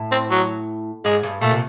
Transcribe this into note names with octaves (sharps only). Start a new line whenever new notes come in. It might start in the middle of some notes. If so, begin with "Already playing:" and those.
Already playing: A2
C4
F#3
G#2 G#3
G2
A#2 A3
C3